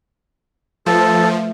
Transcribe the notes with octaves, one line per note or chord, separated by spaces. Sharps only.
F3 A3 A4 B4